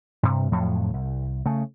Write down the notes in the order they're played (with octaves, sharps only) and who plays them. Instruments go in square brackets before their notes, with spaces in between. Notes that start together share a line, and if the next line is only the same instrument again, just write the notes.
[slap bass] G2 C3
F2 A2 F3 F#3
C2
C#3 A3